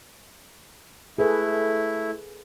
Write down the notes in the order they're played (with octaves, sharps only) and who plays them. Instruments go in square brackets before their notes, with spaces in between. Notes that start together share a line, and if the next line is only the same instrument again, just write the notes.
[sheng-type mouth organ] A3 E4 [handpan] G#4 A4 B4